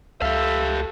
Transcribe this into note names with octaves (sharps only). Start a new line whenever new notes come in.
C#2 G4 A4 E5 F5